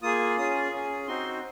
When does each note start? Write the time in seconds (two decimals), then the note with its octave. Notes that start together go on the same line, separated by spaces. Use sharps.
0.02 A#3 F4 G#4 D#6
0.37 C#4 F4 G#4 D#6
0.72 C#4 G#4
1.08 C4 D#4 F#4 C6